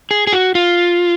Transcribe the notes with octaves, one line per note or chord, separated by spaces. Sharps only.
G#4
G#4
F#4
F4